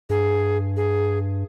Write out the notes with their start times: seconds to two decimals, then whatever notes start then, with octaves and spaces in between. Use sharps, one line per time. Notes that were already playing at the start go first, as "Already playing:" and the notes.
0.10 G2 G#4
0.77 G#4